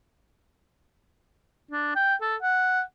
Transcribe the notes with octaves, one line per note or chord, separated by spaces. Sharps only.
D4
G5
A4
F#5